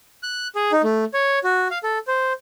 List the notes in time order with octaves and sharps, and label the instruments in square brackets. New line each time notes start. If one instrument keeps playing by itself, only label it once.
[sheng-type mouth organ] F#6
G#4
D#4
A3
C#5
F#4
F5
A4
C5